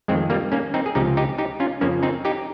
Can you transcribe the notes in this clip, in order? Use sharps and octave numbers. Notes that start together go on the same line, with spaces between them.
F2 D#3 G#3 C4
G3 A#3
A#3 C#4
C4 D#4
G#4
C#2 C3 F3 D#4 G4
D#4 G4
D#4 G4
C#4 F4
F2 C#3 F3 A#3 C#4
C4 D#4
D#4 G4